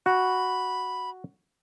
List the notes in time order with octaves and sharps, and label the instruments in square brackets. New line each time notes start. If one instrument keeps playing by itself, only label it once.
[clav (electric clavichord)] F#4 [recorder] B5